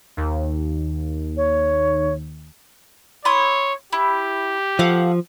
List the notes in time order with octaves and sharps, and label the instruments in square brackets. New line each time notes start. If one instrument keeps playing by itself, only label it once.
[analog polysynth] D#2
[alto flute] C#5
[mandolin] E4 C6 D#6 [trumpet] C#5
[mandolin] E4 [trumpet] G4
[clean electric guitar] F3 [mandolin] A4 F5 F#5